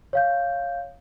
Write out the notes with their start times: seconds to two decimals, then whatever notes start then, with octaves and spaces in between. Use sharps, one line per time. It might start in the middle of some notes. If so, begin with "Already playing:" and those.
0.13 C#5 F5 G6